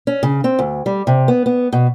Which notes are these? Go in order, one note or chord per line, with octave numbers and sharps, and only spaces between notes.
C#4
C#3
C4
D2
G3
C3
B3
B3
B2